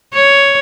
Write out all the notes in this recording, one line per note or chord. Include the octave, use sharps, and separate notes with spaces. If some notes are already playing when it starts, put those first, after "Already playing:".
C#5